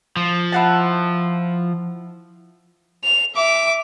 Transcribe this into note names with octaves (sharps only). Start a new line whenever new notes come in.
F3
E4 F#5 A5
F7
E5 D6